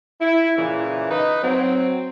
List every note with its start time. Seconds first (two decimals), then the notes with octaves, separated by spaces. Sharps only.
0.21 E4
0.56 A#2 C#3 E3
1.09 D#4 B4
1.42 F#3 C4